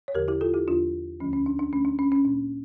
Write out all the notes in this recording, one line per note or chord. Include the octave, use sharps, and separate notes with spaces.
C#5
E2 D3 F3 G4 A#4
E4 G4
F4 A4
E4 G4
E2 D3 F3 D4 F4
D2 D3 F3 A3 C#4
C#4
D4
D4
D2 D3 F3 A3 C#4
D4
C#4
C#4
A#2 G3 A#3 D4